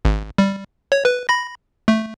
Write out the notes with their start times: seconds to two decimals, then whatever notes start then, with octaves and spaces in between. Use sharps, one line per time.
0.05 G#1
0.38 G3
0.92 C#5
1.05 B4
1.29 B5 A#6
1.88 A3